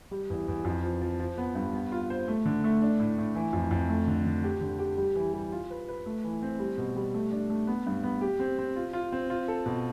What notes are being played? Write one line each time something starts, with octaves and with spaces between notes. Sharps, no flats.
G3
E2
E2
F2
F3
F3
F3
B3
G2
B3
F4
C5
A3
D3
A3
D4
A2
A2
E3
F2
F2
A3
D3
D3
G4
D3
G4
G3
E3
G3
F4
B4
B4
A3
E3
C4
G3
B2
G3
A3
D4
A3
B3
G2
B3
G4
C4
C4
F4
F4
C4
F4
A4
B2